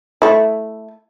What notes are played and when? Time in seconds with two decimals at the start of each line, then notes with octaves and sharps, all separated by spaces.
0.22 A3 E4